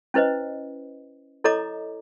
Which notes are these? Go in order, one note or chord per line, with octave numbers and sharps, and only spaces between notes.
C#4 E4 B4 C5 D#5
E4 A4 C#5 D#5 A#5 D6